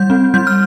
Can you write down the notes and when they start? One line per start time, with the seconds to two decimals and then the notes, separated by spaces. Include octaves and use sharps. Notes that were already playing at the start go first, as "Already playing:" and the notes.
Already playing: G3 G6
0.10 C4
0.34 G3 G6
0.47 F6